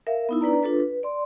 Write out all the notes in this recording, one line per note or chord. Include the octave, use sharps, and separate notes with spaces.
A#4 E5 F5
B3 D#4 E4
D4 B4 D5 A#5
D4 F4 A4 B4
B4
D5 C6